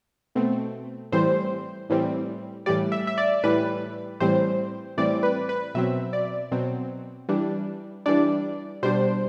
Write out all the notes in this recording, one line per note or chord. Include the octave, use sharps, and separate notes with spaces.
B2 A3 C4
A2 E3 G3 C4 C5
A2 E3 G3 C4
A2 E3 G3 D5
E5
E5
D5
A2 E3 G3 B4
A2 E3 G3 C4 C5
A2 E3 G3 C4 D5
B4
B4
B2 F#3 C4 E5
D5
B2 F#3 C4
E3 G3 D4
E3 G3 D4 D5
B2 G3 D4 C5